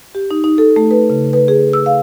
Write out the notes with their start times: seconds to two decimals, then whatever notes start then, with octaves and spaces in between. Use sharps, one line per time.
0.15 G4
0.31 D#4
0.44 D#4
0.58 A4
0.76 A3
0.91 B4
1.10 C#3
1.33 B4
1.48 G#4
1.73 E6
1.86 F5